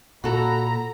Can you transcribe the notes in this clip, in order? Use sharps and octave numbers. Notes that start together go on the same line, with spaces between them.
A#2 F#4 A4 A#5 B5